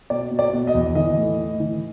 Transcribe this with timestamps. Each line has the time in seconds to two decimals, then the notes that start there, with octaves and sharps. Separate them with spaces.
0.10 B2 D5
0.31 B2
0.39 D5
0.53 B2
0.67 D#5
0.74 E2
0.95 E3 D#5
1.17 A2
1.38 A2
1.60 E3